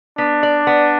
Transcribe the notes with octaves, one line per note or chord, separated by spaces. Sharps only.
B3 D4
D5
B3